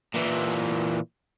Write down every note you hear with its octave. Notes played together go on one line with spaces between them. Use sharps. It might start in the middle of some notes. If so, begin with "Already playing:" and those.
A#2 E3